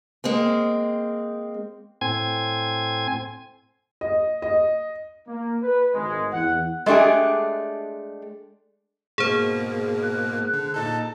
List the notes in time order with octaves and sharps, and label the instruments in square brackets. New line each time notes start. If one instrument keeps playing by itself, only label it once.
[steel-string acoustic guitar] G#3 A#3 C4
[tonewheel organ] A2 C4 G#5 G#6
[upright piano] D#5
D#5
[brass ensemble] A#3
B4
G#1 G#3
E2 F#5
[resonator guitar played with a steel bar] G#3 A3 D4 G4 G#4
[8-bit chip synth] G#2 B2 A#3 [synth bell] G#4 C5
[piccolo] F#6
[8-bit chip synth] D3
[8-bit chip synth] A#2 D#4 A4 [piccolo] A5